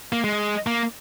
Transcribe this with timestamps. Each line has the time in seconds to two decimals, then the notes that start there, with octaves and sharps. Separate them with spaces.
0.13 A#3
0.24 G#3
0.67 A#3